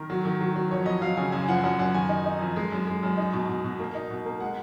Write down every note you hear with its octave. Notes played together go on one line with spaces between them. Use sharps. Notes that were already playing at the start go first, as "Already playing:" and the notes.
Already playing: D#3 A#4
F#3
D#3
F#3
F#3
F2 C#5
F2 D#5
F#3 F5
C#3 G#5
F#2 G#5
F3 F#5
F#2 F#5
F#2 F#5
D#3 G#5
D#4
D#4
F2
G#3
F#2
G#3
F#2
D#4
B2
B2
B2
A#3
D#4
B2
A#3
G#3 F#5